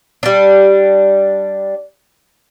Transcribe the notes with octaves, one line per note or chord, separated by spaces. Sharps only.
G3 D4